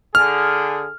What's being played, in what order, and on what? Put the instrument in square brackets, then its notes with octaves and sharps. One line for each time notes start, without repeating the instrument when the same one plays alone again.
[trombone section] D3 G#4 [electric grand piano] F6